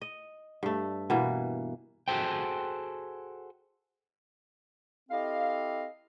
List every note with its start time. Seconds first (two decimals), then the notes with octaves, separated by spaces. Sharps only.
0.01 D#5
0.63 G2 A3
1.10 B2 E3 A#3
2.08 F#4 G#4 A4 C5 G5
5.09 C4 E4 G4 A4 D#5 F5